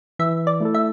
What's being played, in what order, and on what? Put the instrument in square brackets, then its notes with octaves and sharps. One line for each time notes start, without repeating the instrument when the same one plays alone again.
[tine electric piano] E3 [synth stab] E5
[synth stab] D5
[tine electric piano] A3 E4 A4
[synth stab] E5